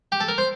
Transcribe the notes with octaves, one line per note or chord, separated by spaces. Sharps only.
G4
A4
A#4
C5